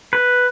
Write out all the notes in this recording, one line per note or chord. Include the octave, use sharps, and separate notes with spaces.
B4